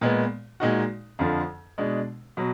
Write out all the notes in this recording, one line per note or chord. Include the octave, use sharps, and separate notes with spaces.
A#2 G#3 B3
A#2 G#3 D#4 F#4
F2 D3 F3
B2 G#3 D4
B2 F#3